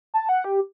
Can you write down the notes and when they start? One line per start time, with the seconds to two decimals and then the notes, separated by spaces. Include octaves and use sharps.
0.14 A5
0.29 F#5
0.44 G4